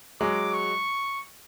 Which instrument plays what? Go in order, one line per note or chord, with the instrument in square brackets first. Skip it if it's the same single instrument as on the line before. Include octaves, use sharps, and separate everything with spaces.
[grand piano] F#3 G#3 [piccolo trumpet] D6
[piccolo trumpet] C#6